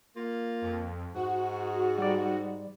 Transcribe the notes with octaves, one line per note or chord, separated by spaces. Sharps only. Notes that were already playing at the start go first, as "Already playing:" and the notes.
A#3 F4
F2
G#2 F#4
G3 D5